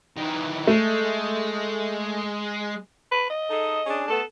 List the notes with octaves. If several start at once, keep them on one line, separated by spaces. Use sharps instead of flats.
D#3 E3
G#3 A3
B4
D#5
D#4 G#4 A4
C#4 D4 G#4
A3 B3 A4